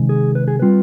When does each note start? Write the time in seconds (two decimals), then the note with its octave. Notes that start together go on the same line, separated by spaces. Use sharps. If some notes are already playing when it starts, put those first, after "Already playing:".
Already playing: C3 D#3 G#3
0.09 G#4
0.35 B4
0.48 G#4
0.60 G3 C4 F4 B4